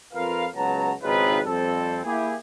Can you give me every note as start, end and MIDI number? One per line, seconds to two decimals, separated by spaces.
0.13 0.46 41
0.13 0.46 65
0.13 0.46 70
0.13 0.46 71
0.13 0.46 77
0.54 0.93 37
0.54 0.93 54
0.54 0.93 59
0.54 0.93 66
0.54 0.93 81
0.54 0.93 82
1.03 1.39 32
1.03 1.39 49
1.03 1.39 60
1.03 1.39 63
1.03 1.39 65
1.03 1.39 71
1.45 1.99 41
1.45 1.99 55
1.45 1.99 60
1.45 1.99 69
2.04 2.34 58
2.04 2.34 64
2.04 2.34 67
2.04 2.34 68